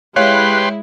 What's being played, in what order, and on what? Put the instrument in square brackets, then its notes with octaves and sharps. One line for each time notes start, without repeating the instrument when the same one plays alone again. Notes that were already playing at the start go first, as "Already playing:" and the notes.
[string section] G#3 E4 [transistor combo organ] G4 B4 C6 [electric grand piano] C#5 F5 [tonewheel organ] F#6